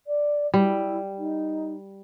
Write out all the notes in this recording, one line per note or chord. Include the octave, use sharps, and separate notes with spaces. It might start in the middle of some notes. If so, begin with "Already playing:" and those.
D5
G3 E4
D#4